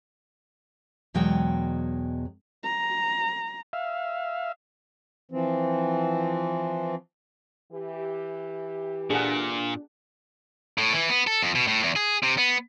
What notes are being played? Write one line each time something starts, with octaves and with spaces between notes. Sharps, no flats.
E2 B2 F#3 G#3 G5
A#5
E5 F5
E3 F3 C4
E3 G4
A#2 D4 G#4 A4 F#5
A2
E3
B3
A4
F2
B2
A2
E2
G#4
C3
B3